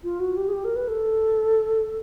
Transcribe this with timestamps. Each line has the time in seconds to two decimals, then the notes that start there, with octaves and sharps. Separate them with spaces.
0.04 F4
0.20 F#4
0.37 G4
0.48 G#4
0.53 G4
0.65 A#4
0.76 B4
0.88 A4